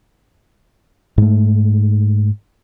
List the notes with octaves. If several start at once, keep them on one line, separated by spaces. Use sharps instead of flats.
G#2 A3